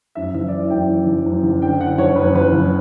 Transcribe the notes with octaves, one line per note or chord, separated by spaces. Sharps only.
F#2 E5
F#1 E5
D5
E3 E5
F#2 G5
E3
F#1
F#2
F#1
D3 G5
D3 F#5
F#1 C#5
F#2 B4
F#1 B4
F#1